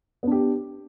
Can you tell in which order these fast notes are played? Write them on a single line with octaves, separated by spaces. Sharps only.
B3 D4 G4